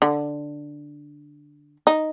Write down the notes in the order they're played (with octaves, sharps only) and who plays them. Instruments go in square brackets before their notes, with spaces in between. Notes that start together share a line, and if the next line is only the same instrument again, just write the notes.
[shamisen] D3
D#4